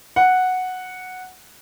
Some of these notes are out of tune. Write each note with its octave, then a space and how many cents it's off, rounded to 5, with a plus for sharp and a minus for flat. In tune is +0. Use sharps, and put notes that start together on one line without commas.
F#5 -5